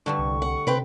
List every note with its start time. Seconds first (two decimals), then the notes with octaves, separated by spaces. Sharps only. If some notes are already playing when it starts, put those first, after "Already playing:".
0.06 G2 D3 G3 A3 C#6
0.19 C2
0.42 F#5
0.67 C3 C4 B4 G5